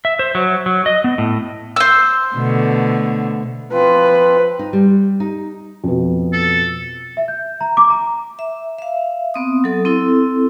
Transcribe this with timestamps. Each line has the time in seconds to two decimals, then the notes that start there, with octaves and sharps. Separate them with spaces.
0.05 E5
0.19 C5
0.35 F#3
0.66 F#3
0.86 D#5
1.04 B3
1.18 A2
1.76 C5 E6
2.35 B2 D3 A3
3.72 F3 C4 F4 B4
4.59 D#4
4.73 G3
5.20 D#4
5.84 F2 B2
6.33 A4
7.17 E5
7.28 G6
7.61 A#5
7.77 D6
7.90 A#5
8.39 E5
8.79 E5 F5
9.34 B3 C4 D#6
9.64 F#3 A4
9.85 C4 E4 A4